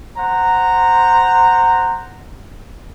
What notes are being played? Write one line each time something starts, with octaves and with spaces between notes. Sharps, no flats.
C5 F#5 A#5